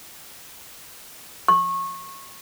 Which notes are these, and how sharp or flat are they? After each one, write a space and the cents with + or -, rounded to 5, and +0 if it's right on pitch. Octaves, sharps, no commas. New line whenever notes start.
C#6 -25